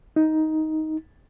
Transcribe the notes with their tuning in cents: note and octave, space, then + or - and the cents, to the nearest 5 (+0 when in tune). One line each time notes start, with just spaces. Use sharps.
D#4 +10